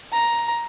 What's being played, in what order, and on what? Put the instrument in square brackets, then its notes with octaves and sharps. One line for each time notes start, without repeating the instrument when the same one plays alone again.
[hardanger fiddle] A#5